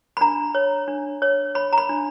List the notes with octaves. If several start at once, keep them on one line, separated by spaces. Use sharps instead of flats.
B5
D4 A#5
C#5
D4
C#5
C#5 B5
A#5
B5
D4